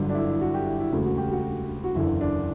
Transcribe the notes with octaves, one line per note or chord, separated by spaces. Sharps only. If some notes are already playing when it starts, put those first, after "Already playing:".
Already playing: G1 G2 D3 F#3
D4
E4
E4
F#4
G4
E4
E4
E1 D2 C#3 F#4
F#4
G4
F#4
F#4
F#1 E2 D3 E4
D4